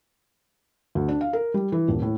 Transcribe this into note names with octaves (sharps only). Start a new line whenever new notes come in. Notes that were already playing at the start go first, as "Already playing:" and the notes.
D2
D4
F5
A#4
G3
E3
D#1
A2